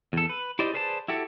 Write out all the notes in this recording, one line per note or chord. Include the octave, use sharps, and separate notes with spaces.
E2 A4
B4
E4 G4 C5 D5 D#5
G#4 B4 C5 D5 A5
E4 F#4 G4 A4